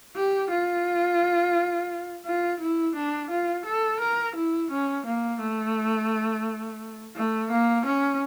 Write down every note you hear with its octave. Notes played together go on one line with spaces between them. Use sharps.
G4
F4
F4
E4
D4
F4
A4
A#4
E4
C#4
A#3
A3
A3
A#3
C#4